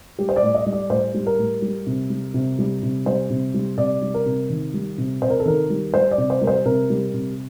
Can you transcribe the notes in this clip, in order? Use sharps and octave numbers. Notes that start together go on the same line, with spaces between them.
G3 G4
C5
D5
A2
D#5
G3
D5
A2 C5
G3
A#4
A2
G3
C3
G3
C3
G3
C3
G3 C5
C3
G3
C3 D5
G3
A#4
C3
D#3
G3
C3
C3 C5
A#4
A4
D#3 A#4
G3
G3 C5
D5
C3
C5
G3 A#4
C5
C3 A#4
G3
C3